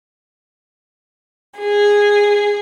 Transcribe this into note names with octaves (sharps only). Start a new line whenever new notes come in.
G#4